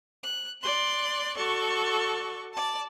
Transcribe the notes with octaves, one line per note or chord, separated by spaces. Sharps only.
F#6
D5 C6 F#6
F#4 A4 D5 C#6
D5 A5